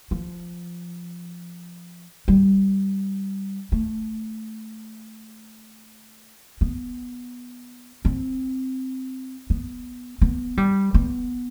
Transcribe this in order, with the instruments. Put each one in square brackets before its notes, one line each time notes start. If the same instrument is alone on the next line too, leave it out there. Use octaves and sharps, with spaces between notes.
[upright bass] F3
G3
A3
B3
C4
B3
B3
G3
B3